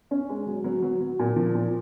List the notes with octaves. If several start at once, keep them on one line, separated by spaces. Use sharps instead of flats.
C#4
G#3
F#3
F#3
F#3
F#3
A#2
F3
A#2